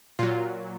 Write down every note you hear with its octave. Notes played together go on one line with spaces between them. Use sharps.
A#2 F#3 F4